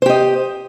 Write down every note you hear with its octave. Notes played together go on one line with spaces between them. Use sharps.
G4 C5 D#5